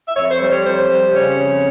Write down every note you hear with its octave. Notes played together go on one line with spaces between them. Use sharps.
E5
F2 C#5
C5
G3 C5
C#5
F2 C5
G3
C#3 C#5
F2